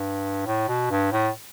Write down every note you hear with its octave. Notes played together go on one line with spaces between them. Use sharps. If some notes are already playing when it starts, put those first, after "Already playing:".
Already playing: G2
A2
B2
G2
A2